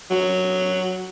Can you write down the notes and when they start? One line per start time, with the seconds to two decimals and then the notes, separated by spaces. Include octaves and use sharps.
0.11 F#3